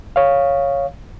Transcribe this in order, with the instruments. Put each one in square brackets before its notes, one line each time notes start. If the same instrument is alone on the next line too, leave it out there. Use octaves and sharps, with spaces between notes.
[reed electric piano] C#5 F5